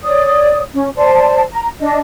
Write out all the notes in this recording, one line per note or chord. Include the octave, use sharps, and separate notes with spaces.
C#5 D5 D#6
C#4
C5 D5 A5
A#5
D4 D#5